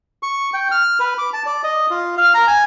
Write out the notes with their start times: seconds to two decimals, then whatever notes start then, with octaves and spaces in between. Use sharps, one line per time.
0.23 C#6
0.54 G5
0.71 F6
1.00 B4
1.18 D6
1.33 A5
1.46 D5
1.64 D#5
1.90 F4
2.18 F5
2.34 A#5
2.48 G#5